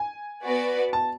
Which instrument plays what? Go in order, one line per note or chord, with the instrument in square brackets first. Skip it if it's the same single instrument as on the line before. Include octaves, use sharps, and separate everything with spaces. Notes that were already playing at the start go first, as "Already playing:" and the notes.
Already playing: [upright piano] G#5
[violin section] B3 F#4 B4 D5
[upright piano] A5